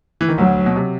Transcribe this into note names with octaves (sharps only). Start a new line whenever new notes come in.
E3
D#3
D2 D3 F#3
B2
C3